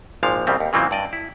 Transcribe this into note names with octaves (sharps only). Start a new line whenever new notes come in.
G#1 A#2 F3 G#3 F5
C2 F2 C#3 G3 C4
D#2
A#2 C#3 E3 F#3 A#3 C4
G2 D5 D#5
E4